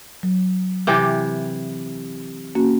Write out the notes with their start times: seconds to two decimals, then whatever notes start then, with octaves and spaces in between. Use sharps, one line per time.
0.23 F#3
0.87 C3 E3 G4
2.55 A#3 C#4 F#4